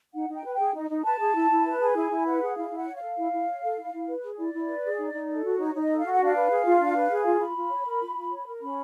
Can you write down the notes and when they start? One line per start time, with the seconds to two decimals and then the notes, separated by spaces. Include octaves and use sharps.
0.14 D#4 F#5
0.29 D#4 G5
0.44 B4
0.54 G5
0.59 G#4
0.74 D#4
0.90 D#4
1.04 B4 A5
1.19 G#4
1.35 E4
1.51 E4
1.66 B4
1.81 G#4
1.95 E4 G#5
2.11 E4
2.26 B4 F#5
2.41 G#4
2.55 E4 F5
2.71 E4 F#5
2.86 C#5
2.96 A4 F5
3.17 E4
3.32 E4
3.47 C#5
3.62 A4
3.77 E4
3.93 E4
4.08 B4
4.22 G#4
4.38 E4 D5
4.53 E4
4.68 B4
4.84 G#4
4.99 D#4
5.13 D#4
5.29 A4
5.44 F#4
5.58 D#4 C#5
5.74 D#4 D#5
5.90 A4
5.99 F#4 F5
6.12 F#5
6.20 D4
6.25 F5
6.35 B4
6.50 G#4
6.65 F4
6.80 D4
6.95 B4
7.10 G#4
7.26 F4
7.40 F4 B5
7.55 F4
7.71 C#5
7.86 A#4
8.01 F4
8.16 F4
8.31 C#5
8.47 A#4
8.61 C#4 B5